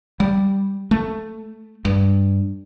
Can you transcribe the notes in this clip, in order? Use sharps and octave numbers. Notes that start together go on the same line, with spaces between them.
G3
A3
G2